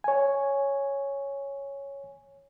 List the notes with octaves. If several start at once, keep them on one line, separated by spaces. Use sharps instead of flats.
C#5 G#5